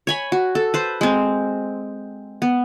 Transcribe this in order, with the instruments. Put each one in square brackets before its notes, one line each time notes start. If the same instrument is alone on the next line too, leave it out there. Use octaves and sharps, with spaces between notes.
[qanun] C#5 G#5 B5
F#4
A4
B4 C5
G#3 C4
B3